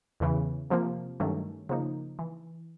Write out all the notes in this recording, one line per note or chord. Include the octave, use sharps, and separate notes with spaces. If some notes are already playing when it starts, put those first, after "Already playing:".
E2 C#3 E3
C3 F3 A#3
G2 D#3 F#3 A3 C#4
C#3 F3 A#3 D#4
E3